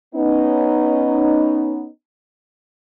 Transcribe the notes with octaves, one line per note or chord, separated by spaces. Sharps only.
B3 C#4 D#4